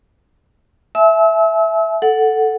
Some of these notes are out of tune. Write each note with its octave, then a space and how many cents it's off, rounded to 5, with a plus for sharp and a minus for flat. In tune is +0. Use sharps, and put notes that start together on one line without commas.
E5 +0 G#5 +45 E6 -35
A4 +0 F#5 +0